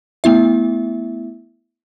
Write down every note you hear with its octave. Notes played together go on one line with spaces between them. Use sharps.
A3 B3 E4 E5